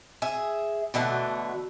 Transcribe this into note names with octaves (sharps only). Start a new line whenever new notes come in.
G#4 E5
B2 D3 E3 A3